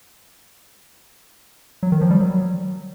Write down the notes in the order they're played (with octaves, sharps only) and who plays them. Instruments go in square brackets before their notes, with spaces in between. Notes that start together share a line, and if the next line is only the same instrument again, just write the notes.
[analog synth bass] F#3
D#3
F3
G3
F#3